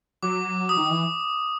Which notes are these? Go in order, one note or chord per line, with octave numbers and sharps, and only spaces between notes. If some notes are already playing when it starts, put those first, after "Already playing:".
F#3 D6
D#6
D#3
E3